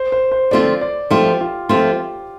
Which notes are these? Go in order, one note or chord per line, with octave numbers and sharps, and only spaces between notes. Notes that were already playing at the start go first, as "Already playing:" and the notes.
Already playing: C5
C5
C5
D3 F3 A3 C4 F4 D5
D5
F3 A3 C4 F4 G4
F4
F3 A3 C4 F4 G4